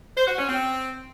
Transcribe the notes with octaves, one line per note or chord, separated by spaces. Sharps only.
C5
F#4
C#4
C4